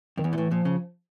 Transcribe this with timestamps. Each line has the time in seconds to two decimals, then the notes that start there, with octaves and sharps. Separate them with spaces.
0.17 F2 D#3
0.24 E2 E3
0.33 A#2
0.38 A2
0.51 A#2 F3
0.65 C#3